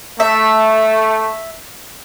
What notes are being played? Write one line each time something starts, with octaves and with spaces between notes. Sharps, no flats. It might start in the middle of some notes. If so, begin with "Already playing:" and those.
A3 E5